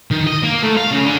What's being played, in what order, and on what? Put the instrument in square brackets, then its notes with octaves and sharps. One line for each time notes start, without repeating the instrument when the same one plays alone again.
[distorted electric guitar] D#3
D#5
A#3
A3
F5
C#3
D3